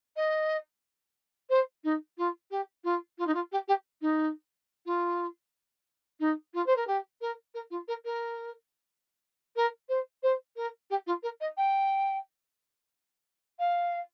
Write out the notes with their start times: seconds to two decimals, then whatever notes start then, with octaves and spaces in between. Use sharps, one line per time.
0.16 D#5
1.50 C5
1.84 D#4
2.18 F4
2.51 G4
2.84 F4
3.18 F4
3.27 D#4
3.34 F4
3.52 G4
3.68 G4
4.01 D#4
4.86 F4
6.20 D#4
6.54 F4
6.66 C5
6.76 A#4
6.87 G4
7.21 A#4
7.54 A#4
7.70 F4
7.88 A#4
8.05 A#4
9.56 A#4
9.89 C5
10.23 C5
10.56 A#4
10.90 G4
11.07 F4
11.23 A#4
11.41 D#5
11.57 G5
13.59 F5